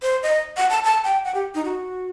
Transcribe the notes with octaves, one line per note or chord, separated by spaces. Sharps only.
C5
D#5
F#5
A5
A5
G5
F#5
G4
D#4
F#4